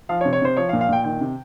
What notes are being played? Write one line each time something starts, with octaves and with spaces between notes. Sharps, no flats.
F3 F5
C#5
C3
C#5
C3 C5
F3 C#5
F5
A#2
F5
A#2 G5
D#3 G5
C3